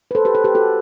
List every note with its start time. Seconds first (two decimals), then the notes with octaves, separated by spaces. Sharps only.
0.11 B4
0.15 A4 C5
0.25 G4 B4
0.34 A4 C5
0.44 G4 B4
0.55 F#4 A4